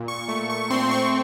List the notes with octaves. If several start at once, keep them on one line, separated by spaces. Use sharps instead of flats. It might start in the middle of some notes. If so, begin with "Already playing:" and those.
Already playing: A#2
C#6
A3 C#6
C#6
C4 C6
C#6